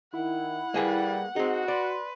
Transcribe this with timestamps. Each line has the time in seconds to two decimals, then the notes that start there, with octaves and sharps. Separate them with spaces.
0.13 D#3 E4 F#5
0.74 G3 A#3 G#4 B4
1.36 C4 D#4 F#4 G#4
1.68 B4 D5 C6